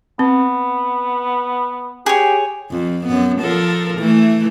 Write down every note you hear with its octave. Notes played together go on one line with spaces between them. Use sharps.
B3 C4
G4 G#4 C#5
F2
F#2 B3
F3 A4 A#4
E3 A3